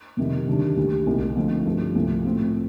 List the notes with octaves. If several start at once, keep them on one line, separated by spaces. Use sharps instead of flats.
F2 C3 D#3 G3
D#2 D3 G3 D4
D2 D3 G3
C2 A#2 A3 D#4
D3 F3 A3 C4 D#4
G2 F3 A3 D4 F4
C2 A#2 F3 A3
A2 A3 C4 F4